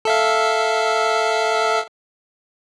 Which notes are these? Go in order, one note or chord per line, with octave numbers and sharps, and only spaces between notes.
A4 E5 F5